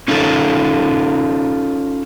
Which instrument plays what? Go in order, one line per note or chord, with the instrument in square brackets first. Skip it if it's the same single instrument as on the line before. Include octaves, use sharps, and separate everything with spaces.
[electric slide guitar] C#4 D#4 F4 A4 C#5